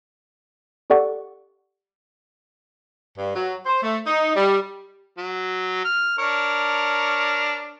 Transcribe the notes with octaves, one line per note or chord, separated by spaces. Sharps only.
G4 A4 D5 F#5 C#6
G2
F#3
C5
A3
D#4
G3
F#3
F6
D4 A#4 C#5